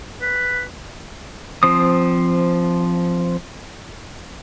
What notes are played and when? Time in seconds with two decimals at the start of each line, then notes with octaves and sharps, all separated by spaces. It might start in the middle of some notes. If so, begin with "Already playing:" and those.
0.22 B4
1.63 F3 C4 D#6